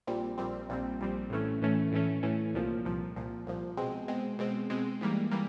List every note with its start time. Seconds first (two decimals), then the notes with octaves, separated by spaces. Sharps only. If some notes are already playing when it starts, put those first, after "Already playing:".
0.07 A#1 A#2 G3 C4
0.38 A#1 A#2 G3 C4
0.69 A#1 A#2 G3 C4
1.00 A#1 A#2 G3 C4
1.30 A2 E3 A3 C#4
1.61 A2 E3 A3 C#4
1.92 A2 E3 A3 C#4
2.23 A2 E3 A3 C#4
2.54 C2 A#2 F3
2.85 C2 A#2 F3
3.16 C2 A#2 F3
3.47 C2 A#2 F3
3.77 B2 G#3 C4
4.08 B2 G#3 C4
4.39 B2 G#3 C4
4.70 B2 G#3 C4
5.01 G#2 E3 G3 A#3
5.31 E3 G3 A#3